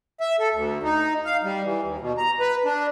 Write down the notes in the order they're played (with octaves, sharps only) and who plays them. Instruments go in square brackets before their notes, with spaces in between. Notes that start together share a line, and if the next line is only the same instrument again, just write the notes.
[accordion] E5
A4
D2
D#4
F5
G3
E3
D#2
B2
A#5
B4
D4